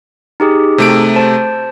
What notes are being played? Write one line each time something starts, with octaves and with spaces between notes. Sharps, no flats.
D#4 G4 G#4
C3 A3 D7
C5 A5